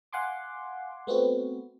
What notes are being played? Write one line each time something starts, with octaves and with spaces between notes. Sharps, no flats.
F5 F#5 G#5 C6 D6
A3 B3 C4 F#4